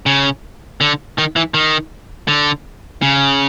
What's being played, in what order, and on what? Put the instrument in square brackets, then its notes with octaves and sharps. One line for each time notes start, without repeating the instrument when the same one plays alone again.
[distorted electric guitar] C#3
D3
D#3
E3
D#3
D3
C#3